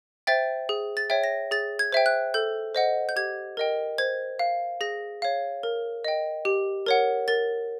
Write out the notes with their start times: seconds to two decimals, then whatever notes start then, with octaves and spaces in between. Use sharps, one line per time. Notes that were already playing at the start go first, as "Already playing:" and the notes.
0.27 C5 E5 G5 A6
0.69 G#4
0.97 A6
1.10 C#5 E5 G5
1.24 A#6
1.51 G#4 A6
1.79 G#6
1.93 C5 E5 G5
2.06 F#6
2.34 A4 G6
2.75 C5 D#5 F#5
3.09 G6
3.16 G4 G#6
3.57 A#4 D#5 G5
3.98 C5 G#6
4.39 F5
4.81 G#4 A#6
5.22 C#5 F5
5.63 A#4
6.05 D#5 G5
6.45 G4
6.86 A#4 C#5 F#5
7.28 A#4 A6